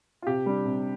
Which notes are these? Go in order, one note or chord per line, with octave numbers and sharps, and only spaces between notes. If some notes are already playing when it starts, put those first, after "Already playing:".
F4
C3 G4
G3 D4
C3